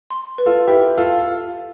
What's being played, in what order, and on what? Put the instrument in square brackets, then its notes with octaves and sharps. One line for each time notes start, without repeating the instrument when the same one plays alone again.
[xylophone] C6
B4
[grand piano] F4 A4
[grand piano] E4 G4 [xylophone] B4
[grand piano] F4 A4 [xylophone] F5